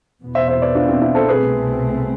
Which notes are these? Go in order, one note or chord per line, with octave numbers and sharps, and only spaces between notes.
E2 B2 B3
C5 E5
C5 E5
B4 D5
D4 F4
C4 E4
C4 E4
A4 C5
C2 B2 A3 C4 G#4 B4